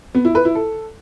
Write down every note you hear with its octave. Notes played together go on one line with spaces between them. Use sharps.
B3
E4
B4
E4
A4